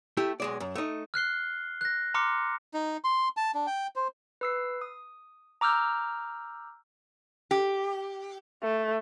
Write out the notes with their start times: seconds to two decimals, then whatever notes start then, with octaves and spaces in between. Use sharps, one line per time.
0.17 A3 E4 G4
0.40 B1 G#3 D5
0.60 F#2
0.75 A3 D#4
1.14 F6 F#6 C7 G7
1.81 F#6 A#6
2.14 A#5 C6 D6 F6 C#7
2.74 D#4
3.04 C6
3.37 A5
3.55 D4
3.67 G5
3.96 C5
4.41 B4 E6 C7
4.81 D#6
5.61 A#5 D6 E6 F6 G6
7.51 G4
8.63 A3